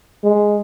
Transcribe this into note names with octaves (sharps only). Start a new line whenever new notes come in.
G#3